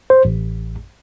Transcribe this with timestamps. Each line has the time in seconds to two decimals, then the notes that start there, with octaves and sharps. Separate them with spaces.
0.10 C5
0.25 A1